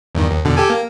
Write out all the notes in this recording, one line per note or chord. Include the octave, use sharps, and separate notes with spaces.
E2 G2 D#3
D#2
E2 B2 D3
G4 A4 G#5
A#3